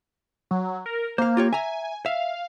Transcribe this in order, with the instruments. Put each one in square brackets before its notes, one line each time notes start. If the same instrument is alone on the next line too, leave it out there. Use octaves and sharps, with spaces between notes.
[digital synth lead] F#3
A#4
[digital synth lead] A#3 [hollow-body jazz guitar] C5 F5
[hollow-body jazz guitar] F4 G4 C#5
[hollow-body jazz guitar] E5 A#5 [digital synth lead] G#5
[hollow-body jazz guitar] E5 [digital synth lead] F5